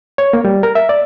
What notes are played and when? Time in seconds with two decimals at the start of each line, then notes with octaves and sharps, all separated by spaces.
0.18 C#5
0.33 A#3
0.45 G3
0.63 A#4
0.75 E5
0.89 D5